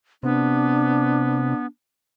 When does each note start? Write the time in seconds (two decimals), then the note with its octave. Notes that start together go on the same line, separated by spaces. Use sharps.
0.23 C3 B3 D4